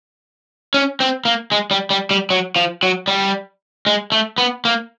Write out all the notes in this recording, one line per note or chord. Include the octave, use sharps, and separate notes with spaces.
C#4
C4
A#3
G#3
G3
G3
G3
F#3
F3
F#3
G3
G#3
A3
B3
A#3